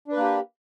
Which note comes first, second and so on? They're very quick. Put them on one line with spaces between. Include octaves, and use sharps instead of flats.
D4 B4 A#3 G4